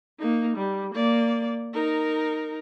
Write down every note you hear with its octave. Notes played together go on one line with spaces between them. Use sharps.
A#3 D#4
G3
A#3 D5
D#4 A#4